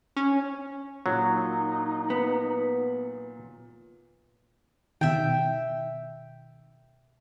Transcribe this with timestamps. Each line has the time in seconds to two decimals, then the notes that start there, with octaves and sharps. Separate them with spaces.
0.16 C#4
1.06 A#2 F#3 D#4
2.10 B3
5.01 B2 D#3 E5 G5